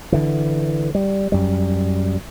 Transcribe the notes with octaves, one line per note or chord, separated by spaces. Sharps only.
D3 E3
G3
F#2 G3